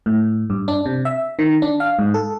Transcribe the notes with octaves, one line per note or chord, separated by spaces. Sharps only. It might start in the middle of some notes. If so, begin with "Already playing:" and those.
A2
G2
D4
C3
E5
D#3
D4
F5
G#2
A4